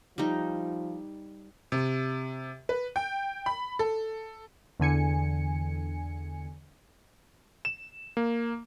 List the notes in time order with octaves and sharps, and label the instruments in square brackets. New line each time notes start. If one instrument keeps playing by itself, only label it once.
[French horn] F3 [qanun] G3 D#4
[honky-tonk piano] C3
B4
G5
B5
A4
[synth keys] E2 D3 G#5 C#7
[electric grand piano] E7
A#3